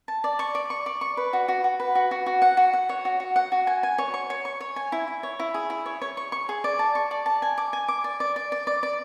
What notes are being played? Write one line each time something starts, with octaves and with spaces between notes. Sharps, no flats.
A5
D5
C#6
D5
C#6
D5
C#6
B4
F#4
F#4
F#4
B4
F#4
F#4
F#4
F#5
F#4
F#5
C#5
F#4
F#4
F#5
F#4
G#5
G#5
C#5
C#6
C#5
C#6
C#5
G#5
E4
E4
C#5
E4
G#4
E4
C#5
C#5
C#6
C#6
G#4
D5
A5
C#6
D5
A5
G#5
D6
G#5
D6
D5
D5
D5
D5
D5
D5